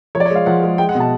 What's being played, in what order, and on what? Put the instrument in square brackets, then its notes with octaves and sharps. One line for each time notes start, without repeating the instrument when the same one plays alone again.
[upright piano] F3 C#5
D5
C#5
G#3 F5
F3 F#5
G#3
G#3 G5
F#5
B2
A5